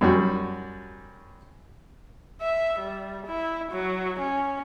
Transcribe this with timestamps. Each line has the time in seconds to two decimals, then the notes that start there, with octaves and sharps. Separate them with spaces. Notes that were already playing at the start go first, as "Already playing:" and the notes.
0.01 F#2 G3 F#4
2.41 E5
2.79 G3
3.27 E4
3.72 F#3
4.19 C#4